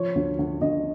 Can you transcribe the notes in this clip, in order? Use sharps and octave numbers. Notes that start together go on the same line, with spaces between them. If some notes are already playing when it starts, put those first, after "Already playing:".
Already playing: F3 C#5
D2
D2
D2 D#5